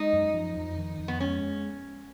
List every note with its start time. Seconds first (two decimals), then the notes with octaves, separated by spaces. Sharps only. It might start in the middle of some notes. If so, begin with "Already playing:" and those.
Already playing: G#3 D#4
0.13 F#2
0.34 F3
0.56 F2
0.77 D#3
0.99 F2
1.08 B3
1.20 G#3 C#4